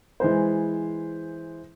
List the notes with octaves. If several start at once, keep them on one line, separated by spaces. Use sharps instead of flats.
E3 G#3 C5